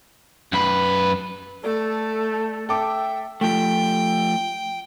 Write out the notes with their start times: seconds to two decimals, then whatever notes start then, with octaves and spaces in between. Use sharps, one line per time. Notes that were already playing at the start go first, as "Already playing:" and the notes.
0.53 F#2 B4
1.63 A3 A4 D5
2.69 A4 E5 G5 D6
3.41 F3 A3 G5